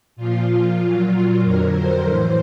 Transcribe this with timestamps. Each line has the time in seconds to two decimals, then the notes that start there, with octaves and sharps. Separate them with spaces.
0.16 A#2 F3 F4
0.79 A#2 F#3
1.43 F2 D3 F#3 A#4
1.74 C5
2.06 A2 E3